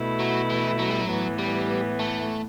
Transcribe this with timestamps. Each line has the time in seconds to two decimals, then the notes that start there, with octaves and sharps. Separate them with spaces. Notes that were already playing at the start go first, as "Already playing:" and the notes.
Already playing: B2 A3 E4
0.20 F#3
0.50 E3
0.79 F#3
0.90 G3
1.01 F#3
1.10 A2 E3 B3
1.39 G3
1.99 A3